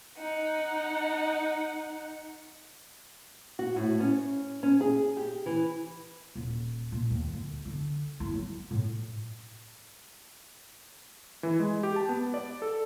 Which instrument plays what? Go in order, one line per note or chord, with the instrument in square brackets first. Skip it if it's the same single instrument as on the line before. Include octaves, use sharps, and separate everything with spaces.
[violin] D#4 F#5
[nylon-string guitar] F#4
A2
C#4
C#4
G#4
G4
E3
[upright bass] D#1
A#2
D#2
D2
D3
E4
F#3
A2
[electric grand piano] E3
G#3
G4
A5
B3
D5
A4